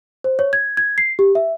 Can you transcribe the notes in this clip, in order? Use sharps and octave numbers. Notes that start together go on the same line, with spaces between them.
C5
C#5
G#6
G#6
C7
G4
E5